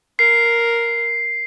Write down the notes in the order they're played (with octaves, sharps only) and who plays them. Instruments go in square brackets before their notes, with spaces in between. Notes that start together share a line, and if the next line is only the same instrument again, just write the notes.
[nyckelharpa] A#4 [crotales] C7